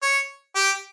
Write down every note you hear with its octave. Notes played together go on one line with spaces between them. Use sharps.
C#5
G4